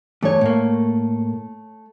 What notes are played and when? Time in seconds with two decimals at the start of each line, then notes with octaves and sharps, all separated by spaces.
0.23 E2 A3 C#5
0.41 A2 A#3